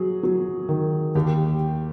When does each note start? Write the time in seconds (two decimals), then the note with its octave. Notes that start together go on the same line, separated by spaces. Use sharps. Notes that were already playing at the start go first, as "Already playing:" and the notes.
Already playing: F#3 G#4
0.23 F#3
0.69 D#3
1.15 D#2 G4